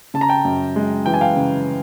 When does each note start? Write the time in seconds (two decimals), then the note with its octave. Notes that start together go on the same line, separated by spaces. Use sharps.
0.14 C#3 A5
0.21 A#5
0.29 G5 A5
0.45 F#2
0.76 G#3
1.06 E3 G5
1.14 G#5
1.21 F5 G5
1.36 C#3